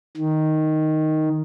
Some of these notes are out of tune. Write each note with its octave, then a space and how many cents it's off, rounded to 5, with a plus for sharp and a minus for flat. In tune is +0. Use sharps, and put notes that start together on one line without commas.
D#3 +0